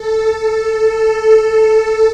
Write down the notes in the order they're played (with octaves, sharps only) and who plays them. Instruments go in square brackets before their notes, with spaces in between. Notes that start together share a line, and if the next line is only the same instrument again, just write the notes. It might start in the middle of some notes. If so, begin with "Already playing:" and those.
Already playing: [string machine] A4
A4
A4